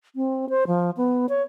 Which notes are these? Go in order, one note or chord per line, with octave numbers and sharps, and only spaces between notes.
C4
C5
F3
B3
C#5